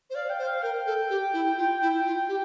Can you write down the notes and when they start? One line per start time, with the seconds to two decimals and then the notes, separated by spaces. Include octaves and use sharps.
0.10 C5
0.15 D5 F5
0.30 G5
0.39 C5
0.43 F5
0.63 A#4 G5
0.86 A4
1.10 G4
1.33 E4
1.57 F4
1.81 E4
2.05 F4
2.28 G4